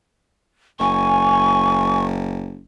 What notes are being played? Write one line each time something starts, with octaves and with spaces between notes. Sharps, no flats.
F#1 G#5 C#6